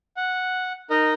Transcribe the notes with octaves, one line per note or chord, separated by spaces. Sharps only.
F#5
D#4 A#4 D#5